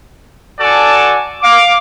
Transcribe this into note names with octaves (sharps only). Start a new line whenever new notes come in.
F#4 A4 D5 G#5 A5
F5 D6